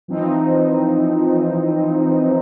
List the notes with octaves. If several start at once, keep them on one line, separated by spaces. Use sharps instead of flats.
E3 F3 C4 D#4